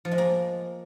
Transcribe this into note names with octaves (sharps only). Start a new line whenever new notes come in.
F3
G#3
A#3